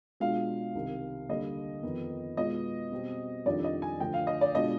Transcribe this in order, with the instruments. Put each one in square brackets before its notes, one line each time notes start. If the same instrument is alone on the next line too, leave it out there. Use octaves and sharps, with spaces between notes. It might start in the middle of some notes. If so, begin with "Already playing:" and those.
[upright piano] B2 G#3 D4 F4 F5
C2 C3 D#3
D#2 D3 G3 D#5
F2 D#3 B3 D#4
B2 G#3 B3 F4 D#5
B2 G3 C4
F2 D#3 G3 D4 F4 D5
D#5
G#5
D2 D3 F3 G5
F5
D#5
D5
B2 G#3 D4 F4 D#5